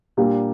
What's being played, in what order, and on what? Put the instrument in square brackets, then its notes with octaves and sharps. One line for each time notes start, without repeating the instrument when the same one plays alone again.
[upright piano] A#2 G3 A#3 D4 G4